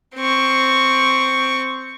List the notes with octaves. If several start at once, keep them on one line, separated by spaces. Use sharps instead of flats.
C4 C#6